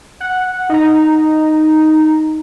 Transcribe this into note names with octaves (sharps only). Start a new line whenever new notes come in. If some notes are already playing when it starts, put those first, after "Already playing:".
F#5
D#4 A#5